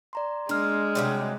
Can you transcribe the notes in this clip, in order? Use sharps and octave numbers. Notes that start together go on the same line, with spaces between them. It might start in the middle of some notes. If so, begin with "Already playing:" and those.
D5 A#5 C6
G#3 A#3 D4 F6
C3 F#3 G3